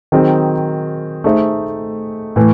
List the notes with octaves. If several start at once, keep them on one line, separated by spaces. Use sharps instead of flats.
D#3 F#3 C4 D#4 G#4
A3 D#4 G#4 C5 E5
A2 E3 A3